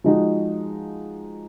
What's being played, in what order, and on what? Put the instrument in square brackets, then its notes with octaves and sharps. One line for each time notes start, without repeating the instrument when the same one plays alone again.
[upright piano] F3 G#3 D#4 F#4